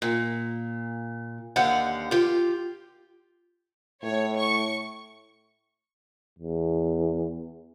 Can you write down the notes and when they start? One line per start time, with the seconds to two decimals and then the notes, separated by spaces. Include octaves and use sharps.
0.02 A#2
1.56 D#2 D3 G4 F5 F#5
2.11 F4 G4
4.03 A2 C#5
4.38 C#6
6.39 E2